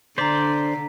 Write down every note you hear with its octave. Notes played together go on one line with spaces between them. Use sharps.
D3 C5 D5 A#5 B6